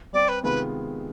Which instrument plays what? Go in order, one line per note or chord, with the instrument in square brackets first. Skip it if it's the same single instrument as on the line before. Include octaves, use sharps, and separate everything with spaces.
[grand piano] G3 C4 G4 [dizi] D5
[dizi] B4
[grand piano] C3 D#3 G#3 B3 F4 [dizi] B4